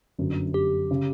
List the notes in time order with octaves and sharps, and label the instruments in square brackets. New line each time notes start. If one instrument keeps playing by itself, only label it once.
[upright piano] G1 F#2 D3
[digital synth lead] G4
[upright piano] C#3